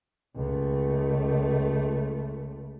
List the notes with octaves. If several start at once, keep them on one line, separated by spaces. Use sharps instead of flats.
C#2 A3